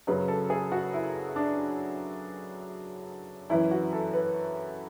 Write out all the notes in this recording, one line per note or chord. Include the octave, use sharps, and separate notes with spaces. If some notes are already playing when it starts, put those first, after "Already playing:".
F#2 C#3 F#3 B4
A4
G#4
F#4
E4
D4
F#2 E3 E4
F#4
A4
B4